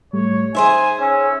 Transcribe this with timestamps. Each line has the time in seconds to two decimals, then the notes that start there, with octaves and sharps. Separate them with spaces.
0.13 A2 G3 A3 C#5
0.55 D#4 G#4 C5 E5 G#5
1.00 C#4 E6